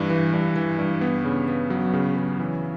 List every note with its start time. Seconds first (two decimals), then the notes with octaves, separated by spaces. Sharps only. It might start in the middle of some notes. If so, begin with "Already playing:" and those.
Already playing: G2 E3
0.10 E3
0.33 G2
0.56 E3
0.79 G2
1.01 B3
1.25 C#3
1.48 B3
1.70 F#3
1.93 C#3
2.17 C#3
2.39 E3